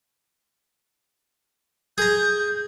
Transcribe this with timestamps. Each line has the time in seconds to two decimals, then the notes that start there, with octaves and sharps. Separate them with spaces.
1.98 G#4 A#5 G6